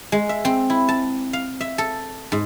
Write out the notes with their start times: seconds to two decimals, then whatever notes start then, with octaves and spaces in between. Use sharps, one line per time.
0.12 G#3
0.29 E5
0.45 C4
0.70 E4
0.89 A5
1.33 F5
1.61 E5
1.78 A4
2.32 G#2